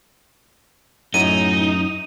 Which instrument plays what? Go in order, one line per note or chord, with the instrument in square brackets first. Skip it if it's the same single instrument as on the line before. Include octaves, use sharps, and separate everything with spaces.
[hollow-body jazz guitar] F#2 [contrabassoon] A2 [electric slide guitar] D#4 [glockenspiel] D#7